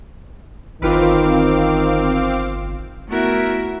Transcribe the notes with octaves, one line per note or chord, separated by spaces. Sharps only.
G1 D#3 C4 F4 B4 F5 D6
A3 B3 E4 F#4 A#4 E5